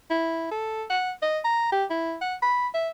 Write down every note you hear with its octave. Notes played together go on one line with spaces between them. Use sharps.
E4
A4
F#5
D#5
A#5
G4
E4
F#5
B5
E5